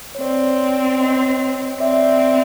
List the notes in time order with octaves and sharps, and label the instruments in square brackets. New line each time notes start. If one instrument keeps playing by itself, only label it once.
[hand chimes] C#5
[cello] C4 [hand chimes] C5 D5
[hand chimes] C#5 D#5
[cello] C4 [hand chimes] D5 E5